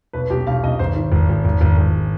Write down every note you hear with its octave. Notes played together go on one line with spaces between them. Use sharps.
B1 B4
B1 G4
B1 F5
B1 D#5
G#1 C5
D#3
G#1
G#1
G#1
G#1
G#1